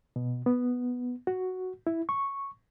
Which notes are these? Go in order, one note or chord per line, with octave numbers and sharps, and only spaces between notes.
B2
B3
F#4
E4
C#6